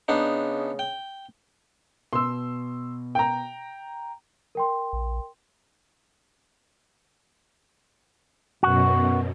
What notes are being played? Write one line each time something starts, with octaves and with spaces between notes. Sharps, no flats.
C#3 B3 D4 D#4
G5
B2 C6 E6
G5 A#5
A#4 G5 C6
A#1
F#2 B2 F#4